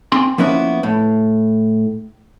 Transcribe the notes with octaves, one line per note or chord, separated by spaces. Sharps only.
C4 G#5 C6
F3 A#3 B3 C#4 E4 B4
A2